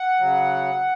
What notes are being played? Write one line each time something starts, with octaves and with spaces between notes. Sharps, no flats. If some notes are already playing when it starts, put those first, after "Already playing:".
Already playing: F#5
C#3 F#3